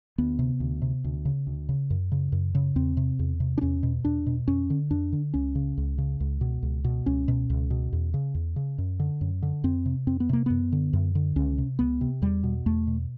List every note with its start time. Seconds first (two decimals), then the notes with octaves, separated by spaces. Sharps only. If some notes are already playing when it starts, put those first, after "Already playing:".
0.18 D2 B3
0.39 C3
0.60 D2
0.82 C3
1.04 D2
1.25 C#3
1.47 D2
1.69 C#3
1.90 F#2
2.12 C#3
2.32 F#2
2.55 C#3
2.76 E2 C4
2.97 C3
3.19 E2
3.40 C3
3.58 D4
3.61 E2 C#4
3.83 B2
4.05 E2 D4
4.26 B2
4.48 F2 C#4
4.70 D3
4.91 F2 D4
5.13 D3
5.34 C#2 C#4
5.55 C#3
5.77 C#2
5.98 C#3
6.20 C#2
6.41 B2
6.62 C#2
6.85 B2
7.06 C#2 C#4
7.28 B2
7.50 C#2
7.70 B2
7.93 E2
8.14 C#3
8.35 E2
8.56 C#3
8.78 F#2
9.00 D3
9.21 F#2
9.42 D3
9.64 F2 C4
9.86 C3
10.07 F2 C4
10.20 B3
10.29 C3 A#3
10.46 F#2 B3
10.72 D3
10.93 F#2
11.15 D3
11.36 C#2 C#4
11.58 C3
11.79 C#2 B3
12.01 C3
12.22 E2 G3
12.43 B2
12.66 E2 A3
12.87 B2